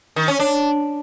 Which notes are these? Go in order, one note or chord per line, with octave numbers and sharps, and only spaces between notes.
D#3
C#4
D4